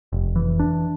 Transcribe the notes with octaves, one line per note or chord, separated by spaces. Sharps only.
F1
E3
D4